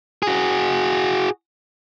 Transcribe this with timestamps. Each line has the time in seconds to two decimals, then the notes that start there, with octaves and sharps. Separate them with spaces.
0.23 F#4 G#4